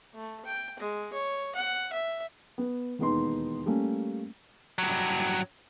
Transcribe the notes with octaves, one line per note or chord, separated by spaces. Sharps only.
A3
G5
G#3
C#5
F#5
E5
B3
E1 D#2 B3 D#4 C6
G3 A3 A#3 C#4
G2 F#3